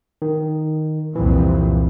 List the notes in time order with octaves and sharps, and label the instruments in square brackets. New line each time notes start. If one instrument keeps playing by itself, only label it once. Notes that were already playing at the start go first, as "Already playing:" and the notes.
[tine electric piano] D#3
[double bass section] C2 F2 A#2 [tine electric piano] E3